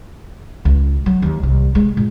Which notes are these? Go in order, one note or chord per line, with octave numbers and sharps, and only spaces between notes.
C#2
F#3
D#2
C2
G#3
A#2